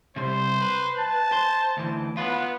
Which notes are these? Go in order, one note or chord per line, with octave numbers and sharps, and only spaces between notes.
C3 G3 C5
B4
A5
C5
D2 E3
B3 F4 B4